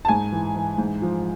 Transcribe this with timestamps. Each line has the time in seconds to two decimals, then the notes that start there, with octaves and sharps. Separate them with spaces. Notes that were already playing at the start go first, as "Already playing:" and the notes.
0.05 A5
0.08 G#2 G#5
0.32 E3
0.56 E3
0.78 G#2
1.02 F3